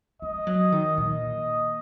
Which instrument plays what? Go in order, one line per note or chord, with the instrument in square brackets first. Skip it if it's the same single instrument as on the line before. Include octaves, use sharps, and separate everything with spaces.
[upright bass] G#3 [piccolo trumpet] D#5
[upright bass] F#3
D#3
[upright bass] A#2 [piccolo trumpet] D#5